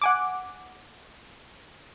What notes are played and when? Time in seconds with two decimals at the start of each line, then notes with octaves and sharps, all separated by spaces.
0.02 F#5 G#5 D6